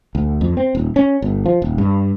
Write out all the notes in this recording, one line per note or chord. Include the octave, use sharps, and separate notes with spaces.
D2
F2
C4
D#1
C#4
G1
F3
D#1
G2